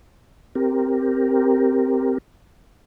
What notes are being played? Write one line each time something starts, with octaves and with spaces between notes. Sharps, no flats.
C4 G4 A#4